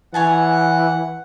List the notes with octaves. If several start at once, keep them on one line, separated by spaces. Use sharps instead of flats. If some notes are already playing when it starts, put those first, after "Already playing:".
E3 C#5 F#5 G#5 A5